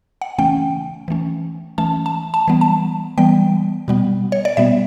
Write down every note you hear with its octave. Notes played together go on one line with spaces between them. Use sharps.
F#5
C#3 E3 A3 C#4 G5
E3 A3 C#4
E3 A3 C#4 A5
A5
A5
E3 G3 B3
A5
E3 G3 B3 G5
B2 G3 B3
C#5
D5
B2 G3 B3 E5